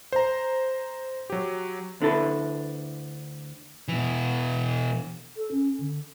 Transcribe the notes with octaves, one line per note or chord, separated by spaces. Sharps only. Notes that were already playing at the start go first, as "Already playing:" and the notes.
C5 A#5
F#3 G4
D2 D3 E4 A4 B4
B2 E3
A4
C#4
D3